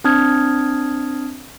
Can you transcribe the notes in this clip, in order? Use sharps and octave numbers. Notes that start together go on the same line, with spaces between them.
C4 D4 A5 D#6 F6 G#6